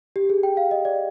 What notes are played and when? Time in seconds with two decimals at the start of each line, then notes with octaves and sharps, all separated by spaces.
0.16 G4
0.30 G#4
0.43 G5
0.57 F5
0.71 D#5
0.85 D5